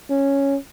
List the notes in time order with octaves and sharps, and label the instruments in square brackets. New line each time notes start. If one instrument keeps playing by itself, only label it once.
[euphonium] C#4